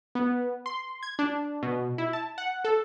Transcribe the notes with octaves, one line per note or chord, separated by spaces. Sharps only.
B3
C6
G#6
D4
B2
E4
A5
F#5
A4